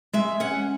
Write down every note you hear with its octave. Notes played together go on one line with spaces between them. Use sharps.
G#3 E5
C#4 F#5